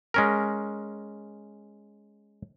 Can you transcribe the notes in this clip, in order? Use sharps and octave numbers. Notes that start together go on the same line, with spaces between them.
G#3 C#4 A#4